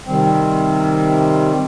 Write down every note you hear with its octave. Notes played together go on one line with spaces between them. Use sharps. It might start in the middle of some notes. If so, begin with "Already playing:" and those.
C3 D#3 G3 C4